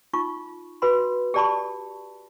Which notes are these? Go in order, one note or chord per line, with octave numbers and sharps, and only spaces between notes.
D#4 F4 C#6
F#4 B4 B5 C6
G4 A4 D5 A5 B5 C#6